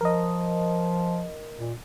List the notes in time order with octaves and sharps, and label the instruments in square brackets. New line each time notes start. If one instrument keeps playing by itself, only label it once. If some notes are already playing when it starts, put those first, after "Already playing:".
[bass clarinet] F3 [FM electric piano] A#4 D#5
[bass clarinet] A#2